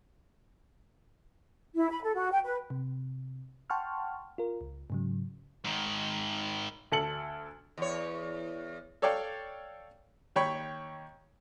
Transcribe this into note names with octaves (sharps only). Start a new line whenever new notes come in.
E4
B5
A4
F#4
G5
B4
C3
F#5 G5 A5 C6 C#6 F6
F4 A#4
C#2
G#2 C#3 F#3
G#2 D#3
D2 A4 C#7 F#7
E2 C#5
A4 C#5 D5 F5 G5
D#2 C#5 G5 B5 C#6